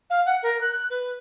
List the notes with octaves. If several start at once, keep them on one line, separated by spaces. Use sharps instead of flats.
F5
F#5
A#4
F#6
B4